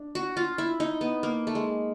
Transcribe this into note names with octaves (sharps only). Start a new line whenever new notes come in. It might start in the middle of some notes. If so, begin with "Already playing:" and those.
Already playing: D4
F#4
F4
E4
D#4
B3
A#3
A3
G#3